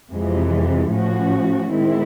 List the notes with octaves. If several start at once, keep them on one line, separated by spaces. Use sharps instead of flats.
F2 C3 E3 G#3
A2 F3 A3 C#4 F#4
D#3 G#3 C4 E4